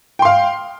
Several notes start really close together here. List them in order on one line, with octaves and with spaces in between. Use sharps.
G5 C6 F5